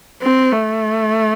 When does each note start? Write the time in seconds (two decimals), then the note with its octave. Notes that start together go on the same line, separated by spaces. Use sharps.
0.22 C4
0.53 A3